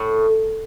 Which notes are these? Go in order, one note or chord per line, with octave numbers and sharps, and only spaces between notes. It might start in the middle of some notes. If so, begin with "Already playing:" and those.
Already playing: A2